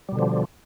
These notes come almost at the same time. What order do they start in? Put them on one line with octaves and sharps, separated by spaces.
G3 B2 D3 F3